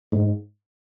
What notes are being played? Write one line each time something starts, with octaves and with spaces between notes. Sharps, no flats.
G#2